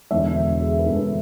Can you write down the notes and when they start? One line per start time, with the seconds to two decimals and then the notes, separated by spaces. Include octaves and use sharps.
0.10 E1 E2 D3 E5
0.61 G#4
0.79 B4
0.86 E1 E2 D3 A4